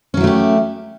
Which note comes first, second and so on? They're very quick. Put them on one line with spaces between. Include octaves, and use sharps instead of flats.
C#4 F#3 E4 A3 G4